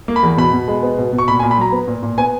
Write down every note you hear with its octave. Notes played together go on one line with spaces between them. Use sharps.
A#3
B5
E2
B2 B5
B2
G#3
B3
B2
B2
C#6
A#2 B5
G#5
A#2
B5
F#3 A#5
B3
A#2
A#2
B3 G#5